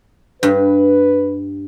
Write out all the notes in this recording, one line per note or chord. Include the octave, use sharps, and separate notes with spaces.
G2 B4